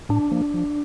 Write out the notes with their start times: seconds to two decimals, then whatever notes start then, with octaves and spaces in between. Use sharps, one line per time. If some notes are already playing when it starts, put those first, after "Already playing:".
0.09 A2 D4
0.31 F3 A#3
0.54 F3